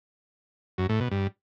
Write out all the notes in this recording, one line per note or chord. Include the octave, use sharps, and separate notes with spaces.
F#2
A2
B2
G2